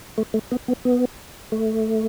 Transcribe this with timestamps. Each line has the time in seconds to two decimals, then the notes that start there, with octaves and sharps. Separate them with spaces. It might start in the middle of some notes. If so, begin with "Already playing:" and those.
0.18 A3
0.34 A3
0.51 B3
0.68 B3
0.85 B3
1.52 A3